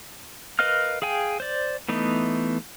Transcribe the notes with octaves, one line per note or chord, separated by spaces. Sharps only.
A#4 B4 D#5 F5 F6
G#4 F5 G5 G#5
C5 D5
E3 A3 B3 D#4